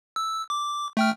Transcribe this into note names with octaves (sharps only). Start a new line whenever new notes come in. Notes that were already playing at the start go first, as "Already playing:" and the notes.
E6
D6
A3 G5 F6